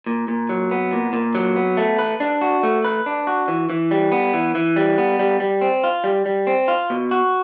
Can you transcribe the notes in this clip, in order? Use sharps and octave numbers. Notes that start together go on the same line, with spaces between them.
A#2
A#2
F#3
B3
A#2
A#2
F#3
B3
A3
B4
D4
F#4
A3
B4
D4
F#4
E3
E3
G3
B3
E3
E3
G3
B3
G3
G3
C4
F4
G3
G3
C4
F4
B2
F#4